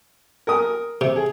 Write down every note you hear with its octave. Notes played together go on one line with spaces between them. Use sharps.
A#4 D#6
C3
G#4